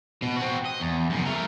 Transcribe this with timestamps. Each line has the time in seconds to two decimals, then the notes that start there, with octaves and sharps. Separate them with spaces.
0.22 B2
0.37 C4 F#4
0.65 D#5
0.80 E2
1.10 F#2 C#3
1.25 A3 A#4